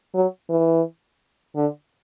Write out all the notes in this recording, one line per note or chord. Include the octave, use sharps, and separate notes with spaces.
F#3
E3
D3